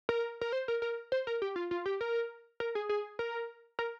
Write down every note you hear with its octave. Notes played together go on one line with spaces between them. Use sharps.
A#4
A#4
C5
A#4
A#4
C5
A#4
G4
F4
F4
G4
A#4
A#4
G#4
G#4
A#4
A#4